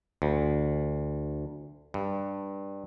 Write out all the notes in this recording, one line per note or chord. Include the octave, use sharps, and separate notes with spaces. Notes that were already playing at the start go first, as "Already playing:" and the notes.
D2
G2